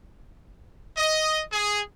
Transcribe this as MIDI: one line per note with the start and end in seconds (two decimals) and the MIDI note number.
0.97 1.40 75
1.52 1.80 68